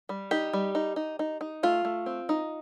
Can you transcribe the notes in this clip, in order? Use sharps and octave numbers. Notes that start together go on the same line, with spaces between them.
G3
D#4 G4
G3
D#4
D#4
D#4
D#4
A3 F4
A3
C4
D#4